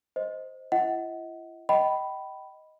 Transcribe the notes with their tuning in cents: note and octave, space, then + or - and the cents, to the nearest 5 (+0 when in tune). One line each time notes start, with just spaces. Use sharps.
C5 +0 D#5 +5
E4 +40 D#5 +40 F#5 +15
D#5 +5 G5 -30 B5 +0